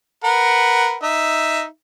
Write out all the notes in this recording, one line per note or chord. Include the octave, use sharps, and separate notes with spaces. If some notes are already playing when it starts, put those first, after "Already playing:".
A#4 B4 F#5
D#4 E5